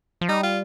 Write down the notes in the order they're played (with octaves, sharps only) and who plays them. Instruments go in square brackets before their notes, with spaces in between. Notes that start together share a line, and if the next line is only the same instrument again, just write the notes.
[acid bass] F3
[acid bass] G3 [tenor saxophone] D#4
[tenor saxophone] F4